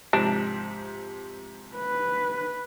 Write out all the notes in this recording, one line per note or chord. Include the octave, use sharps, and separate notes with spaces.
G#2 C3 F3 D4
B4